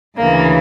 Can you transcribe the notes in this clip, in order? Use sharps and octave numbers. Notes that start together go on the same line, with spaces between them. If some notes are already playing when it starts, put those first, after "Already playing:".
D2 C#3 E3 A#3